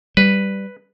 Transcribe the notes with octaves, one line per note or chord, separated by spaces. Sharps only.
G3 B4